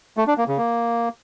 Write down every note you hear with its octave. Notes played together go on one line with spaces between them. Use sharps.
A3
D4
A#3
C#3
A#3